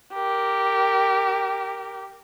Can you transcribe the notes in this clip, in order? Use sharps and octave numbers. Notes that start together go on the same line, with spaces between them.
G4 A#4